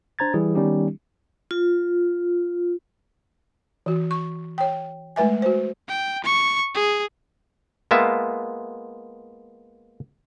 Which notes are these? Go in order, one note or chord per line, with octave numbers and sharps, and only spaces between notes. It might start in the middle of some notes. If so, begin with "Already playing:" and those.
D4 C5 A#5 G#6 A6
E3 G3 E4 G#4
D#3 G3 B3 C#4 D#4 G4
F4
E3 F#4
C#6
C#5 G5
G#3 A3 B4 E5 G#5
F#4 C5
G5
C#6
G#4
G#3 A#3 B3 F4 E5